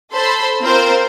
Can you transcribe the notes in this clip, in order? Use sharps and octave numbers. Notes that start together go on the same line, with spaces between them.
A4 C5 B5 C6
C4 F4 A#4 C5